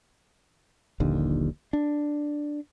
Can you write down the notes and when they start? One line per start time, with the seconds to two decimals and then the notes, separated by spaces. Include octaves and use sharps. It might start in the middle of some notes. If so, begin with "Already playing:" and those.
1.00 D#1 A#1 D#2 D3
1.73 D4